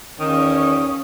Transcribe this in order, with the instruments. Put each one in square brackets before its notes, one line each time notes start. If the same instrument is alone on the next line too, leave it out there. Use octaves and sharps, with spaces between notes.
[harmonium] E2 F3 G5 [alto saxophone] D#3 [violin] C#4 [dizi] D#6